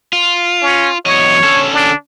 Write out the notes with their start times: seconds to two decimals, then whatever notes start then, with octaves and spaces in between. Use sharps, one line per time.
0.13 F4
0.62 C#4
1.06 E2 F#3 C#5 D#5
1.43 D3 C#4 A4
1.73 D4